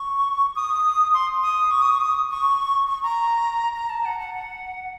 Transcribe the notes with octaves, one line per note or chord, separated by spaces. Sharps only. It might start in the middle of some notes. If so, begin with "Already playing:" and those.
Already playing: C#6
D#6
C6
D#6
C#6
D#6
C#6
D#6
C#6
C#6
A#5
A#5
A5
F#5
F#5
F#5